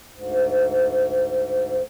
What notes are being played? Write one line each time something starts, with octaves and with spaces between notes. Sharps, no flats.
D2 G#2